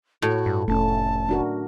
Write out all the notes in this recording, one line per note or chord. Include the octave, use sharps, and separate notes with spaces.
A2 F#4
G2
F1 A3 C#4 A5
D4 F#4 A#4